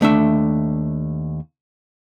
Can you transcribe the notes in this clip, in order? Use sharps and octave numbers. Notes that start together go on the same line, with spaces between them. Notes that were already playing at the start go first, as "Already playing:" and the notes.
D#2 A3 D4 E5